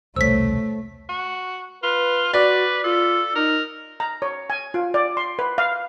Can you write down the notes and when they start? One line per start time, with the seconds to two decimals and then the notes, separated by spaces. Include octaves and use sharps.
0.16 E1 C2 A3 C5 C#5 E6 B6
1.09 F#4
1.83 F4 B4
2.33 F#4 B4 D5
2.84 F4 A4
3.36 D#4 A#4
4.00 A#5
4.22 C#5
4.50 G#5
4.74 F4
4.94 D5
5.17 C6
5.39 B4
5.58 F5